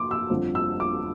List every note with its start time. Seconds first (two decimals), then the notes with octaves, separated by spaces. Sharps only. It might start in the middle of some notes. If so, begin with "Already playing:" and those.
Already playing: C6 D6
0.11 E6
0.30 G1 F2 D3 F3 C4
0.55 E6
0.80 D6